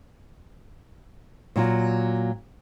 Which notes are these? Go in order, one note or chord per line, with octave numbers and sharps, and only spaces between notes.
A#2 F#3 F4